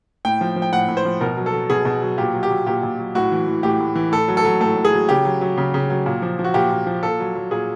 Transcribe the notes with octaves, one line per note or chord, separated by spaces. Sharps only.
A2 G5
F3
F3
G5
A2 F#5
A2
C5
F3
B2 A#4
F#3
A4
F#3
B2 G#4
B2
F#3
A#2 G4
F#3
G4
F#3
A#2 G4
A#2
F#3
A2 F#4
E3
E3
A2 G4
A2
E3
A2 A4
F#3
A4
F#3
A2 A4
A2
G#4
F#3
C#3 G4
F#3
F#3
C#3
C#3
F#3
A#2
F3
F3
F#4
A#2 G4
A#2
F3
A#2 A4
F#3
F#3
A#2 G#4